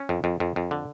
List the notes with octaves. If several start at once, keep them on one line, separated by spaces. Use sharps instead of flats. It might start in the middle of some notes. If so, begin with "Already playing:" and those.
Already playing: C#4
F2
F2
F2
F2
D3